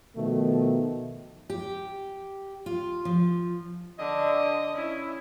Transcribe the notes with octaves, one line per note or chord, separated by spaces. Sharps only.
B2 D#3 F3 A3
G4
F4
F3
D3 D#5
C#4 E4